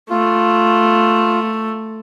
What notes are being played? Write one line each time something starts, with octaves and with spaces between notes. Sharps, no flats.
A3 F4